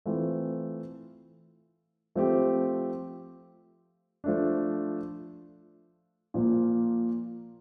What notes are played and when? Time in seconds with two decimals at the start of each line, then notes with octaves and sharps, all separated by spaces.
0.06 E3 A3 C4 F4
2.15 F3 A3 C4 G4
4.24 F3 A3 D4
6.34 A#2 F3 A#3